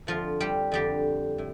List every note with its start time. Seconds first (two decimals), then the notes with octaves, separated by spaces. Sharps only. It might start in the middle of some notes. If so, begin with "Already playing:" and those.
0.07 F2 D3 F3 F4
0.40 G3 G4
0.72 F2 D3 G3 G4
1.38 A2